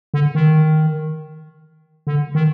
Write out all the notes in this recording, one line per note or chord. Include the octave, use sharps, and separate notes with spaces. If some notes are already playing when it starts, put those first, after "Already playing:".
D3
D#3
D3
D#3